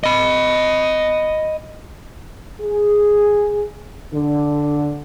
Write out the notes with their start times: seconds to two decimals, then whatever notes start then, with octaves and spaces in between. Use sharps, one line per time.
0.04 D#5 B5
2.61 G#4
4.13 D3